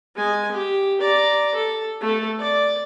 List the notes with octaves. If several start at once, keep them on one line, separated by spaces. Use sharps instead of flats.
G#3 G#5
G4
D5 A#5
A4
A3 A4
D5